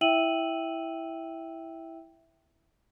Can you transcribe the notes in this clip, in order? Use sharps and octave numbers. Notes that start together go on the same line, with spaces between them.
E4 E5 G5 E6 D#7 F#7